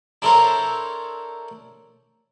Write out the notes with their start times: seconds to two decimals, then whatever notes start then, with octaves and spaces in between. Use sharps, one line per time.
0.22 D4 E4 A4 A#4 C5 C#5